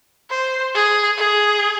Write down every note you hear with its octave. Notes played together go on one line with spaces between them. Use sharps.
C5
G#4
G#4